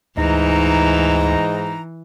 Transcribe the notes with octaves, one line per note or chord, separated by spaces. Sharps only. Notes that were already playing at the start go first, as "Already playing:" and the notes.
D2 G#2 E3 D#4 A#5